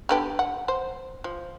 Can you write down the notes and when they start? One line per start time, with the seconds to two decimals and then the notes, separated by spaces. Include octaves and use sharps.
0.09 D3 B3 G4
0.39 F#5
0.68 C5
1.24 F3